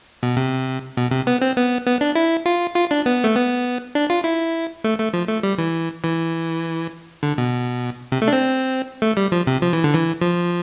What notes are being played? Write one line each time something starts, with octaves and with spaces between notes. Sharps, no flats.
B2
C3
B2
C3
B3
C4
B3
B3
D4
E4
F4
F4
D4
B3
A3
B3
D4
F4
E4
A3
A3
F3
A3
G3
E3
E3
D3
B2
C3
A3
D4
C4
A3
G3
F3
C3
F3
E3
D3
E3
F3